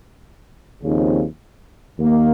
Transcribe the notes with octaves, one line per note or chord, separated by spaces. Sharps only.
D#2 C#3 F3 C4 D#4
D#2 D#3 A#3